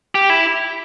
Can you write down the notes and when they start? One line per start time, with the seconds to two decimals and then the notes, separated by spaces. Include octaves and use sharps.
0.15 G4
0.30 E4